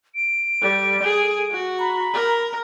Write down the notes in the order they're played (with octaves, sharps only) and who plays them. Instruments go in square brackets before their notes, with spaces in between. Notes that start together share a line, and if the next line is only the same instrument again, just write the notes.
[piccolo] D7
[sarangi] G3 [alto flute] A4
[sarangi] G#4
F#4
[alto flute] A#5 [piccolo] B5
[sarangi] A#4